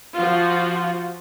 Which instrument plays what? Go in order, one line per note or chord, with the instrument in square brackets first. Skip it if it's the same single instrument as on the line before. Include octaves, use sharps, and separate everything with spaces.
[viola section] F3 F4 F#4